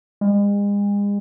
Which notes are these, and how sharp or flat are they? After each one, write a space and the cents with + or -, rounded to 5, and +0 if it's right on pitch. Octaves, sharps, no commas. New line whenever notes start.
G#3 -40